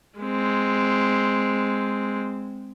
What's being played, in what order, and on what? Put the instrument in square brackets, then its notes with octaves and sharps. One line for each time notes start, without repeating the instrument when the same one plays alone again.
[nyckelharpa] G#3 C4